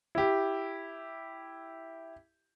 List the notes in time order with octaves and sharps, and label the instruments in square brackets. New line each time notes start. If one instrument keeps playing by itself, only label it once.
[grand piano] E4 G4